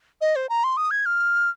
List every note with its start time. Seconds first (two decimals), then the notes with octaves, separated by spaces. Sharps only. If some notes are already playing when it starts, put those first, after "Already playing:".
0.21 D#5
0.36 C5
0.49 A#5
0.64 C6
0.77 D#6
0.91 G#6
1.06 F6